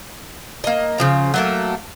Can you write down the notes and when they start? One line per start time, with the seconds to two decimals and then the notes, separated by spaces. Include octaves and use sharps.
0.64 A#3 D#5
0.98 C#3 F3 A#5
1.34 F#3 A3 A#3